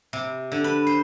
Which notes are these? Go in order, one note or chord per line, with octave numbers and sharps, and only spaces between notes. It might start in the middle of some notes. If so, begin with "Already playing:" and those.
C3
D3
B4
C5